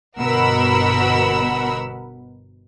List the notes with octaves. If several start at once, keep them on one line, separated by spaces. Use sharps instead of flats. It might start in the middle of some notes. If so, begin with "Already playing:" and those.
G1 B2 A#4 F#5 B5 E6